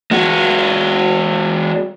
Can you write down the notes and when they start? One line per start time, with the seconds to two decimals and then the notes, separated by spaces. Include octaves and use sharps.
0.11 G#3 F#4